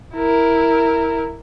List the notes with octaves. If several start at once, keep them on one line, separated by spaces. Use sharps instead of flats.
E4 A#4